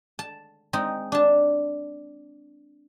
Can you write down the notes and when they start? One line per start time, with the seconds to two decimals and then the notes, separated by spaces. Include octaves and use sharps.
0.19 A5
0.73 G#3 C4 D#4
1.12 D4 A5